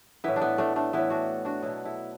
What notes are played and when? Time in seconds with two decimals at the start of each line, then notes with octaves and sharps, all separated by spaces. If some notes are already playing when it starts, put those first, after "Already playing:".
0.24 A2 E3 B3 E4
0.36 D4
0.41 B3
0.58 A3 D4
0.76 A3 D4
0.93 A2 E3 B3 E4
1.10 D4 F#4
1.45 D4 F#4
1.62 B2 F#3 B3 E4
1.85 E4 A4